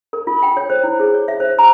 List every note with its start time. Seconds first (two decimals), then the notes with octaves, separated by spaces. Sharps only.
0.13 A#4
0.27 F4
0.43 G5
0.57 C#5
0.70 C5
0.84 E4
1.00 G#4
1.14 C#5
1.28 E5
1.40 C5
1.59 A#5